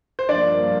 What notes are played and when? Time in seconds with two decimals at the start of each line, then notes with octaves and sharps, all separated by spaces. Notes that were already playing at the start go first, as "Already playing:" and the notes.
0.19 C5
0.29 G2 F3 A#3 D4 D5